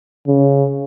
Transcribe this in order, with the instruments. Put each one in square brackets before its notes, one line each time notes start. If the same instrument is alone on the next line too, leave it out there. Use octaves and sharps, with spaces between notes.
[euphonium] C#3